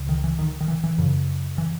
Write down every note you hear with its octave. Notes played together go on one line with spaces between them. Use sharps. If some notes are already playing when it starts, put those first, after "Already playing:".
Already playing: C#2 C#3
D#3
E3
D#3
D#3
E3
E3
F#2 C#3
E3